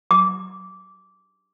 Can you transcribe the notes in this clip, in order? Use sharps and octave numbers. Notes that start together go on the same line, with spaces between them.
D6